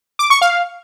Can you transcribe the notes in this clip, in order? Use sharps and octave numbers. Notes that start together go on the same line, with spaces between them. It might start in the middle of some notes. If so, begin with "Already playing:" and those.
D6
C#6
F5